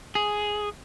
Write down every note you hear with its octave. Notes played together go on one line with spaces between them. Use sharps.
G#4